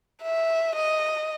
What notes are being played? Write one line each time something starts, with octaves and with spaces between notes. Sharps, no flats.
E5
D#5